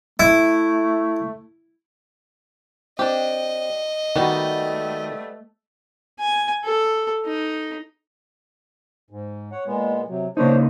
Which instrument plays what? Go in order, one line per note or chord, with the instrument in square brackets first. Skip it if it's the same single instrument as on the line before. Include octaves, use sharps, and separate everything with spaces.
[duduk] A3 [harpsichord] E4
[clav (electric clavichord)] C4 [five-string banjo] D4 G4 [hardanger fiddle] D#5
[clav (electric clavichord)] D#3 F#4 [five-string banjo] G3 B3 D#4 [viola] A3
[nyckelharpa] G#5
A4
D#4
[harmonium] G#2
C#5 F#5
A#2 G#3 B3
C3 F#3
[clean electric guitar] C#3 A#3 D#4 [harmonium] D4 C5 C#5